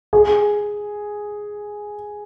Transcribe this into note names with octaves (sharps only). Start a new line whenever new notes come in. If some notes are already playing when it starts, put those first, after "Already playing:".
G#4